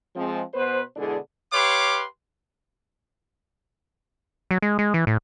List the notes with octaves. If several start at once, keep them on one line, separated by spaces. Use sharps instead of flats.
F3 G#3 C4
B2 B3 B4 C5
B2 D3 G#3 D4 E4 G#4
G4 B4 C#5 F5 C6 D6
F#3
G#3
G#3
E3
A2